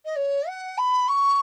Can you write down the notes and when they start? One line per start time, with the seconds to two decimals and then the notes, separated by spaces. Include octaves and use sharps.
0.05 D#5
0.16 C#5
0.48 F#5
0.78 B5
1.08 C#6